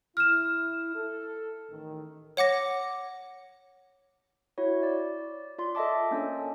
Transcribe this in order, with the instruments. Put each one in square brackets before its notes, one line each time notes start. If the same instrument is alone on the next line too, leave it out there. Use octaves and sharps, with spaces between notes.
[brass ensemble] E4 [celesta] F6 E7
[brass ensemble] A4
A1 D#3
[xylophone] C#5 F#5 D6 A#6
[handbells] E4 F#4 C#5
D5
F4 D5 C6
A4 D#5 E5 A5 D6
A#3 C#4 D4 A4